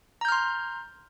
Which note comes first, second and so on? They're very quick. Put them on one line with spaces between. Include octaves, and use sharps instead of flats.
A#5 G6 F6 C6